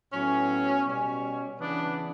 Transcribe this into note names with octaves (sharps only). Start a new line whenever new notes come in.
A2 F#3 B3 C#4
B2 G3 C#4
C#3 E3 B3 D4